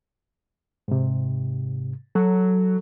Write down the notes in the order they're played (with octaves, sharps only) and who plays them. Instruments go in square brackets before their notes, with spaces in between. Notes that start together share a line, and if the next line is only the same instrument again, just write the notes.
[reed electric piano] G#2 C3
[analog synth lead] F#3 [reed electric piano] A4